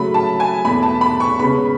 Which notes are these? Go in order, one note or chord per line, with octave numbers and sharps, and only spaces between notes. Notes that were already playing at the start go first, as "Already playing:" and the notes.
Already playing: C#3 F#3 A3 B5
A5
G#5
E2 B2 A3 B5
A5
B5
C#6
C#3 G#3 B3 B5